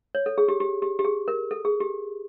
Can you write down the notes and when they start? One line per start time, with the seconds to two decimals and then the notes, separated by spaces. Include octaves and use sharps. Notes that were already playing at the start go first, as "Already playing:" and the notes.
0.15 C#5
0.26 A4
0.38 G#4
0.48 G4
0.60 G4
0.82 G4
0.99 G4
1.05 G#4
1.28 A#4
1.51 A4
1.65 G#4
1.80 G4